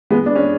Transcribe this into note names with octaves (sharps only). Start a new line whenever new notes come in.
G#3 B3
D4
C#4